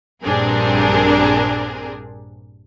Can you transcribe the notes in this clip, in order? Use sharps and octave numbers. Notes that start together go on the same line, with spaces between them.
A#1 G2 C4 D4 G#4 A#4